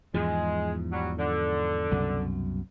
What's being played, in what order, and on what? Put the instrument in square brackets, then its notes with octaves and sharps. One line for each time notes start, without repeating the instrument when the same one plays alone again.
[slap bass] E2 G#2 F3 [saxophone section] G#3
[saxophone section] F#3 G3
D3
[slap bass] C2 F#2 B2